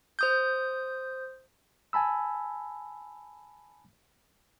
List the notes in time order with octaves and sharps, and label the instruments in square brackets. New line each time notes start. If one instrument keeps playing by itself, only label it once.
[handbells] C5 D#6 G6
[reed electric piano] G#5 A5 B5 E6